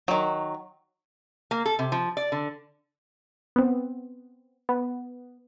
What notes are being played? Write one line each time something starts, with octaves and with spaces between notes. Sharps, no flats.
D#3 F#3
A#3
A4
C3
F3
D5
D3
B3 C4
B3